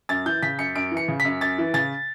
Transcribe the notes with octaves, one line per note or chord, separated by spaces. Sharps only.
F#2 A6
E3 G6
C#3 B6
F#2 C#7
F#2 D7
E3
C#7
C#3
F#2 B6
F#2 A6
E3
C#3 A6